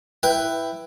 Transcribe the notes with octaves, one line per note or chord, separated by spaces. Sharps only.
E4 B4 G5